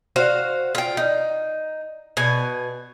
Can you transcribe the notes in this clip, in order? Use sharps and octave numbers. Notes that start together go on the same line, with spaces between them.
F#4 C5 F5
F4 G5
D#4
B2 G#5